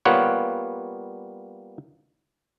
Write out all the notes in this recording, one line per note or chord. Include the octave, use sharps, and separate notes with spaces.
G3 A#3 B3 F4 C#5 F#5